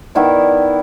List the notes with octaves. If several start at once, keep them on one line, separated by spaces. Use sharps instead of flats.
D#3 B3 E4 D5